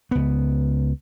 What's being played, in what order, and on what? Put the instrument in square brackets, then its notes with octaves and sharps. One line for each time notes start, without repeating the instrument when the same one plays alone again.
[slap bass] C#2 B3